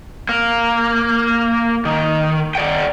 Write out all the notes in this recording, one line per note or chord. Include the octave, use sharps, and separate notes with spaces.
A#3
D#3
D5 F#5 G5